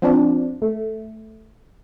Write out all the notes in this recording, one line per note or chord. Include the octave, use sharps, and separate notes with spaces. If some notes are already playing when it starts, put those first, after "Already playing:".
F3 C4 D4
A3